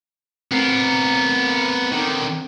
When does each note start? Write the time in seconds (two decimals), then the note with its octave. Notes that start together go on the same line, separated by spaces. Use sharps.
0.52 B3 C4 A#4 C7
1.92 D3 D#3